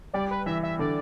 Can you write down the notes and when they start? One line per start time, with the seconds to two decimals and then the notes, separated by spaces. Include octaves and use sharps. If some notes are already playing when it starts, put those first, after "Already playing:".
0.14 G3 D5
0.31 B4
0.46 E3 E5
0.63 E5
0.79 D3 D5